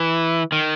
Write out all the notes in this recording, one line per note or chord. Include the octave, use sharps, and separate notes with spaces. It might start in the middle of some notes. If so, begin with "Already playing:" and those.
Already playing: E3
D#3